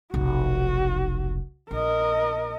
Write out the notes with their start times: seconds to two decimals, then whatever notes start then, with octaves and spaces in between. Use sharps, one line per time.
0.14 F1 B1 F#4
1.71 A#1 A#4 D#5